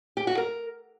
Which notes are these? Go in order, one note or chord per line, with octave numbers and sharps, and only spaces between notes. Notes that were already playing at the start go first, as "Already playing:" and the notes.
G4
F#4
A#4